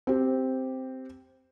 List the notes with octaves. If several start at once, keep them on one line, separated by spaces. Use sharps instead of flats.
C4 G4